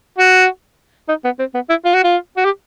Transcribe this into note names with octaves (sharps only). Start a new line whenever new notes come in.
F#4
D#4
B3
C4
B3
E4
F4
F#4
F4
F#4
G4